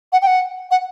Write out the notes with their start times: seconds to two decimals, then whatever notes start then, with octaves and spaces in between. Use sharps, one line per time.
0.13 F#5
0.22 G5
0.27 F#5
0.71 F#5